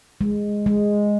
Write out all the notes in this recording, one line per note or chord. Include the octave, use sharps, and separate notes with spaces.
G#3
G#3